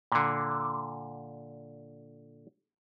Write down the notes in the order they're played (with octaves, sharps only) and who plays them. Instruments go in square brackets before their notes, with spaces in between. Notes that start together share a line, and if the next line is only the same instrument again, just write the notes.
[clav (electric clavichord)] A#2 D3